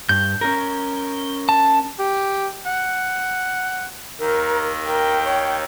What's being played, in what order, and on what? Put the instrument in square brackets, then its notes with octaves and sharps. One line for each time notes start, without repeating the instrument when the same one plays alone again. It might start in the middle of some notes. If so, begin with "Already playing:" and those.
[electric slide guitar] G2 [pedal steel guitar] G6
[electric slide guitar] C#4 A#4
[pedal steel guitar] A5
[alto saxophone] G4
F#5
[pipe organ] D#2 D#3 [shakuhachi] A#4
[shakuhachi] A#4 [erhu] G5
[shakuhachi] C#5